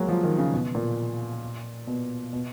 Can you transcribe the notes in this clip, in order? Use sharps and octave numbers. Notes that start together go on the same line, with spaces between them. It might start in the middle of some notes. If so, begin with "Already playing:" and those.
Already playing: F#3 G#3 A#3
F3
D#3
C#3
B2
A#2
B2
B2